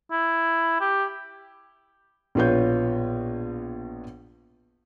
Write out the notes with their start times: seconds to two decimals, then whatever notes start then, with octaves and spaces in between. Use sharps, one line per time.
0.11 E4
0.81 G4
2.35 A#1 B2 F4 B4 C#5 G6